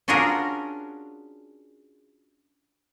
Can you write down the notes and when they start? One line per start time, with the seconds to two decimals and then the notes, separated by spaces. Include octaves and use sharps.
0.08 C#4 D4 F4 F#4 G#4 A#4